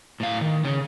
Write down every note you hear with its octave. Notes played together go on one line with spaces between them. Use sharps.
A2 F5
D#3
C#3 C#4